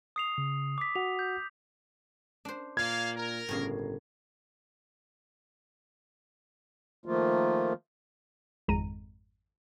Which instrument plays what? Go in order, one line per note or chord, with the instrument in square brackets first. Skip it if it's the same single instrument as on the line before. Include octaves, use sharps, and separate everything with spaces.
[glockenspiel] D#6 C7 F7
[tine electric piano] C#3
[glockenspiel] D6 B6
[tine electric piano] F#4 F#5 [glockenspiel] F7
[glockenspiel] G6
[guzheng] D4 C5
[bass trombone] A#2 [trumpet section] A#3 F5 [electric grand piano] G#6
[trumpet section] A#4
[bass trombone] G1 [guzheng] A2 C#3 A#3
[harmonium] D#3 F3 A3 A#3 F4
[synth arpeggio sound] G#1 F2 G#3 A#5 D#7